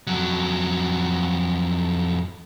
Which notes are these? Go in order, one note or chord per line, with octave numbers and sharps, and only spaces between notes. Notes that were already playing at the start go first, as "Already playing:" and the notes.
F2 F#3